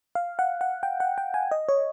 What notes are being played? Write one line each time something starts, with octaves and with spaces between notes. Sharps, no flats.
F5
F#5
F#5
G5
F#5
G5
G#5
D#5
C#5